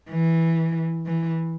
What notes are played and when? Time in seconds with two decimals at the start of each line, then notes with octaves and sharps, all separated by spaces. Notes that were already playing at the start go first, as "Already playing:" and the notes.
0.11 E3
1.06 E3